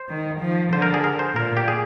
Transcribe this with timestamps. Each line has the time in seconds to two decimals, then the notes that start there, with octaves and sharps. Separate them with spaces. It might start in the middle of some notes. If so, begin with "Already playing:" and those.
Already playing: C5
0.09 D#3
0.41 F3
0.73 D3 C5
0.82 A#4
0.94 G#4
1.04 A#4
1.19 C5
1.35 A#2 A#4
1.57 G4
1.68 G#4